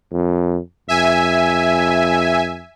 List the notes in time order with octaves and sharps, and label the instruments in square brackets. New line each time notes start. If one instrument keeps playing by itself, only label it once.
[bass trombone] F2
[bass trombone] F2 [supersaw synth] E5 G#5